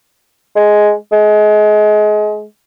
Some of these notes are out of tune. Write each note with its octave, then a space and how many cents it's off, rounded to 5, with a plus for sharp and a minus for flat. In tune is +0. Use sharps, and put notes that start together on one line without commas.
G#3 +5
G#3 +30